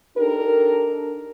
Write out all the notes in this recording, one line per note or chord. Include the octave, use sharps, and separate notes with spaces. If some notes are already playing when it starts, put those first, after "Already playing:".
D4 D#4 G4 A4 A#4